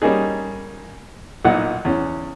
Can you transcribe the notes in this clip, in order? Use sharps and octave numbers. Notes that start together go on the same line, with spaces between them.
G3 A#3 C#4 D#4 G#4
B1 A#2 D#4 F#5
E2 C#4